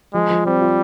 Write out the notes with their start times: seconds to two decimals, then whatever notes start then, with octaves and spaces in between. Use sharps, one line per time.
0.14 F3 G#3
0.30 F3
0.46 G3 C4
0.62 F4